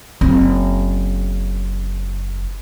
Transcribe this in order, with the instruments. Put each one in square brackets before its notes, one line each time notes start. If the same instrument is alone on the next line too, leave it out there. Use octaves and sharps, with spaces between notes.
[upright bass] F#1 C4